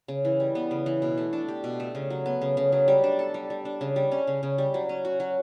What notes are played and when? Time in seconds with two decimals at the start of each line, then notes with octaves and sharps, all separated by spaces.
0.08 C#3
0.25 E3
0.40 G3
0.55 B3
0.71 C#3
0.86 E3
1.02 B2
1.18 A3
1.33 D4
1.48 G4
1.64 B2
1.80 A3
1.95 C#3
2.10 F#3
2.26 B3
2.41 C#3
2.57 C#3
2.72 F#3
2.88 G3
3.04 D4
3.19 A4
3.34 G3
3.50 G3
3.65 D4
3.81 C#3
3.96 G3
4.12 C#4
4.27 C#3
4.43 C#3
4.58 G3
4.74 F#3
4.89 C#4
5.05 F#4
5.20 F#3